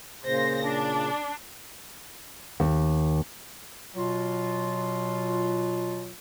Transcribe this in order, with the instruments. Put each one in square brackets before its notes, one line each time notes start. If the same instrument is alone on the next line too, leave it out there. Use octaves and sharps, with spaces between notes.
[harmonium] A#2 C#3 [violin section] C5 A#6
[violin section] D4
[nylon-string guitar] D#2
[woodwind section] B2 F#3 F4